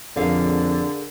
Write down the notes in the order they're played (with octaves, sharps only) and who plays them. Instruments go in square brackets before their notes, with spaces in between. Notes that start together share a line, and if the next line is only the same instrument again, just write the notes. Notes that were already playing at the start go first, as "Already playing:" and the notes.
[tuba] F2 [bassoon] D3 [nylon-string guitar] G#4 A#4 F5